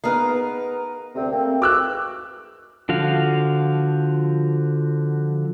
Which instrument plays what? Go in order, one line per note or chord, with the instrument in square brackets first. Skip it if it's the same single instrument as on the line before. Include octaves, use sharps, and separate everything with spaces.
[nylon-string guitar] B3 G#4 F5 [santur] D#4 A#4 B4
[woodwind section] D2 C3 C4
A3 A#3 C4
[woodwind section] G#2 E3 F#4 [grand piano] D6 E6 F#6
[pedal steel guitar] D3 F3 F#4 F5